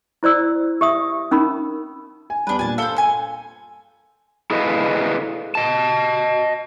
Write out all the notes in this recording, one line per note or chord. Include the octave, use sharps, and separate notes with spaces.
E4 C5 D5 E6
G4 E5 D#6
C#4 D#4 A#4 B5
G#5
G3 B3 D4 B4
G2 A#2 G#5 A5
A4 C5 F5 C#7 G7
G#5
E4 G#4 A4 B4 D#5 F5
D#5 A5